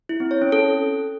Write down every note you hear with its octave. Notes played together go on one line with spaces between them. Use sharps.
E4
C4
C#5
C#4
A4